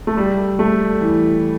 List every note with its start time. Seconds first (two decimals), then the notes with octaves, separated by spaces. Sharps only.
0.07 A3
0.17 G3
0.59 A3
1.01 E3